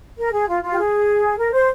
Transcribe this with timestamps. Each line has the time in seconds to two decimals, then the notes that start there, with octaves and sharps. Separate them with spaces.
0.17 A#4
0.33 G#4
0.48 F4
0.62 F4
0.72 G4
0.79 G#4
1.38 A#4
1.53 C5